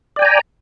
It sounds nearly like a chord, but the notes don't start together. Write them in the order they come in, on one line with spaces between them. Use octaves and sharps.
D5 G5 G#5 A#5